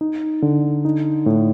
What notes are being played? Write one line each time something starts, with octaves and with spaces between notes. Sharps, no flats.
D#4
D3
D#4
A2